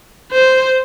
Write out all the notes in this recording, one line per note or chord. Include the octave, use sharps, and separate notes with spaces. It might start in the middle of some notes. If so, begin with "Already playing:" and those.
C5